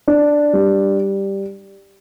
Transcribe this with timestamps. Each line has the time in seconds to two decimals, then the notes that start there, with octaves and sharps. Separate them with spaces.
0.08 D4
0.53 G3